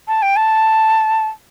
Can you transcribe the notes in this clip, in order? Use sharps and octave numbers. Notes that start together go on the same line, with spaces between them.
A5
G5
A5